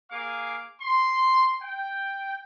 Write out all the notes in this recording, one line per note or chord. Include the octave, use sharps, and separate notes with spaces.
A#3 G#4 F5 D6
C6
G5